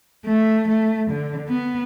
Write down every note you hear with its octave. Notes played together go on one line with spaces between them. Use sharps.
A3
A3
D3
B3